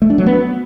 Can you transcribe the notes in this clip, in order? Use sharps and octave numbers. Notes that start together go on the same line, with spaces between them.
A3
D4
F#3
B3